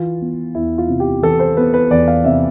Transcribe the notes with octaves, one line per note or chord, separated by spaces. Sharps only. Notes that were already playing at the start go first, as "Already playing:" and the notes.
Already playing: E3 F4
B3
E2 E4
F4
C3
G4
E3 A4
C5
B3 B4
B4
E2 D5
F5
C3 E5